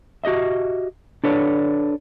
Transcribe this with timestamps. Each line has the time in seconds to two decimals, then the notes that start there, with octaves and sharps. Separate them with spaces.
0.24 F#4 G4 D#5 E5
1.24 D4 A4 B4 C#5 D5